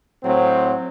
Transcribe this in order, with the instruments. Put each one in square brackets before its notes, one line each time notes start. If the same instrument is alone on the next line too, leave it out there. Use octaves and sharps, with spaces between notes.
[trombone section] A2 F#3 C4